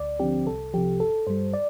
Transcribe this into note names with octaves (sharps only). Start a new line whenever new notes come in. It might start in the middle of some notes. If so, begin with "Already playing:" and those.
Already playing: D2 D5
D3 F3 C4 G4
C2 A4
C3 F3 G4
G1 A4
G2 G3 C5
D5